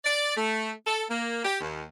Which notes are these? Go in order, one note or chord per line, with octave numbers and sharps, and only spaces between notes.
D5
A3
A4
A#3
G4
D#2